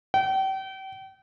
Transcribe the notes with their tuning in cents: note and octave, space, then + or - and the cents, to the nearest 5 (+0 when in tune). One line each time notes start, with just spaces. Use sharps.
G5 -35